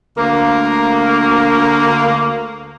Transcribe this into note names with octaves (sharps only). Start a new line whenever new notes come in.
D2 A#3